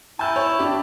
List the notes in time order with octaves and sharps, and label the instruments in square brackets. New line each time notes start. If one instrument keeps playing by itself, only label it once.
[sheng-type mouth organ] E4 A5 [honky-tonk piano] G#5 G6
[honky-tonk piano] C#5
D4 G4